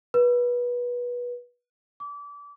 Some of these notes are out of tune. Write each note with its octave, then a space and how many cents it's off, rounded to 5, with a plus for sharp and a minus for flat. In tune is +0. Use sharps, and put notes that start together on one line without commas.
B4 -20
D6 -30